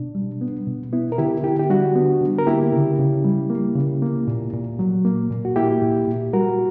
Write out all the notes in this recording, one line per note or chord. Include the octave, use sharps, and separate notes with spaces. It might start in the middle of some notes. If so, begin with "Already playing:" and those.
Already playing: B2 D4
G3
B3
B2
B3 E4
A#4
D3 E4 G4
D3 E4 G4
G4
G3 D4 F#4
B3
D3
A#4
A#3 E4 G4
C#3
C#3
G3
A#3
C#3
A#3
A#2
A#2
F#3
A#3
A#2
F#4
A#3 E4 G4
A#2
A#2
G3 F#4 A#4